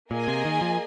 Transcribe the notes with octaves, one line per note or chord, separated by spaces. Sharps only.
A#2 A#3 G#4 D#5 G#5
C3
D#3
F3